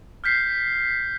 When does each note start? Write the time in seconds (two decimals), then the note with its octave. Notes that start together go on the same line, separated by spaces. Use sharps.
0.24 F6 G6 B6 C7